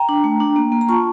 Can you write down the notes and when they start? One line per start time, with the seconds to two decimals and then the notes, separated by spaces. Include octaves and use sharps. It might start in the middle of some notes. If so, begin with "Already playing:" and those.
Already playing: G5 A#5
0.09 D4
0.24 A3
0.40 D4
0.56 A#3
0.72 A#3
0.81 A#5
0.89 F4 A5 C#6